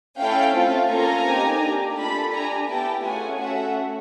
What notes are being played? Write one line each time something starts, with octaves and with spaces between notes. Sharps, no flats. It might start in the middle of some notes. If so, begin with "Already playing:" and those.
A3 C#4 E4 A4 F5 G5
A3 C4 F4
A#3 C#4 F4 A4 G#5 A#5
C4 D#4 G4
A#3 D4 G4
A3 D4 F4 A4 A5 B5
D4 G4 G#5 A#5
B3 E4 G4 G5 A5
A3 C#4 F4 G#4 F#5 G#5
A3 C#4 F#4 A4 E5 F#5